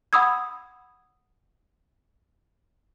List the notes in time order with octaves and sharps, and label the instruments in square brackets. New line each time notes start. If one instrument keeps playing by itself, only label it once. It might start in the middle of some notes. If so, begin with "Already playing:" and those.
[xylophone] F#5 B5 D#6 E6 G#6